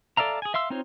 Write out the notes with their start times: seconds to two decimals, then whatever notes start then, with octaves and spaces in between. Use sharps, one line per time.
0.17 A4 D5 E5 F5 A#5
0.42 G#4 G#5
0.54 E5 F5 C6 E6
0.70 C4 D#4 F4 C5 C#5